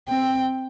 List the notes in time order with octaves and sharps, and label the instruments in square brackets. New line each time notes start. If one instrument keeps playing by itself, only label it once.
[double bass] C4 [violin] G5